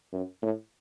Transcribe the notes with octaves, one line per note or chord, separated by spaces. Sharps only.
F#2
A2